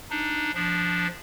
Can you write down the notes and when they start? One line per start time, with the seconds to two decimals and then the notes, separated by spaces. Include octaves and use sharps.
0.10 D4 D#4
0.54 F3 D4